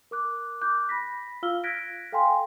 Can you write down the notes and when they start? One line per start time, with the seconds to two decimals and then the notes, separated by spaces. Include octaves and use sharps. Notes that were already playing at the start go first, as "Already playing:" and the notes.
0.11 A#4 D6 F#6
0.62 D6 F#6 G6
0.89 B5 A#6 B6
1.43 F4 F5 E6 F6 G7
1.64 F6 F#6 G#6 A#6 B6 D7
2.12 A4 F5 G5 G#5 C6